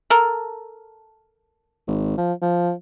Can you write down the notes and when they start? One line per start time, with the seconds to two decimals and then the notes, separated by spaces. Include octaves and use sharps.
0.10 A4 A#4
1.87 G#1
2.18 F3
2.42 F3